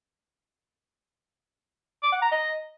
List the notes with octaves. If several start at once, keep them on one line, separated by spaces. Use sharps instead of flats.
D6
F#5
A#5
D#5